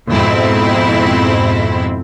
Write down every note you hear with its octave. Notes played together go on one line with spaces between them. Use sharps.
F2 G#2 B2 C4 E4